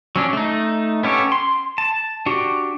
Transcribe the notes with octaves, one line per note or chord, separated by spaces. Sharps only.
F#3 C#4 D4
A3 D#4
B3 C#4 G4 A4 C#5
C6
A5
D4 F#4 G4